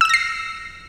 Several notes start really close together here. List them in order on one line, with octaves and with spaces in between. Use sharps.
E6 E7 A#6 C7